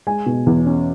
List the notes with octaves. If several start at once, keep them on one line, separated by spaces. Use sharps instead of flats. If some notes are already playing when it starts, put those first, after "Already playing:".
G#3 G#5
B2
E2
C#4